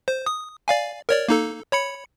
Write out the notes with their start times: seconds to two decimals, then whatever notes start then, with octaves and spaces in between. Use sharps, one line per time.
0.08 C5
0.26 D#6
0.68 D5 F5 G#5
1.09 A#4 C#5 D5
1.28 A#3 D#4 A4
1.72 C#5 B5 C#7